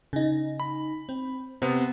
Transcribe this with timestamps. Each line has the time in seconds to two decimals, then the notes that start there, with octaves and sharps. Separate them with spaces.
0.13 C#3 D#4
0.60 B5
1.09 C4
1.62 C3 B3 C4